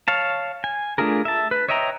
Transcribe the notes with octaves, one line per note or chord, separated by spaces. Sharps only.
C#5 F5 A5
G#5
A3 D4 F4 G#4 A#4
E5 A5
B4
C#5 D#5 E5 G5 A#5